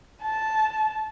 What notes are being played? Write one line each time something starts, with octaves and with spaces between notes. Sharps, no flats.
A5